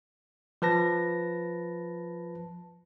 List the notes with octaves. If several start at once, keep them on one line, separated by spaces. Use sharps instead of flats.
F3 B4 A5 A#6